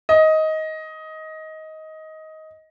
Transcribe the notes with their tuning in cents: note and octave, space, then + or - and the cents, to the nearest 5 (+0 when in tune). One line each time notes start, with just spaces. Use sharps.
D#5 +15